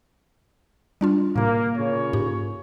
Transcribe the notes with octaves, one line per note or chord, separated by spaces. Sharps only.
G3 D4 F4
A2 C3 A#3
A#2 C#3 C#5
G#2 G4